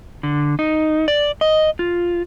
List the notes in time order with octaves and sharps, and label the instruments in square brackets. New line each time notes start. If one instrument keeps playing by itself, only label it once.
[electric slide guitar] D3
D#4
D5
D#5
F4